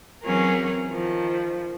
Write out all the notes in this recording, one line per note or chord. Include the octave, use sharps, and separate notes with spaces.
E3 F#3 C4 C#4 G#4 A#4
D#3 F3